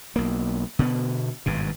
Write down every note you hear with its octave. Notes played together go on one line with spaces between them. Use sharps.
B1 A#3
B2 D3 B3
G#1 G2 B2